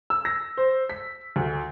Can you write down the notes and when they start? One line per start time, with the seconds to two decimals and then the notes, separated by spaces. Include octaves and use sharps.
0.10 E6
0.25 A#6
0.57 C5
0.89 B6
1.36 D2